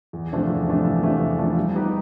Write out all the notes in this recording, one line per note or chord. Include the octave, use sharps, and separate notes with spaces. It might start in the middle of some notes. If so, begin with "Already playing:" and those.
E2
C3 F3 A3 D4
E2
C3 F3 A3 D4
E2
C3 F3 A3 D4
E2
C3 F3 A3 D4
G3
B3 D#4 G4 B4